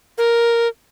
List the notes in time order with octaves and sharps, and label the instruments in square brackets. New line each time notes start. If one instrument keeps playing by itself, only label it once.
[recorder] A#4